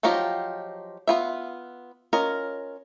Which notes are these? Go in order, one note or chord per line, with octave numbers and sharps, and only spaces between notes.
F3 F#3 D#4 F4 G4
B3 F4 E5
C#4 F4 A#4 D#5